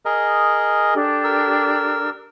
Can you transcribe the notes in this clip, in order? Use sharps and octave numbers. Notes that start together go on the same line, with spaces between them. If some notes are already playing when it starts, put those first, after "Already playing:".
G#4 A#4 D#5
D4 G4 A4
A#4 E6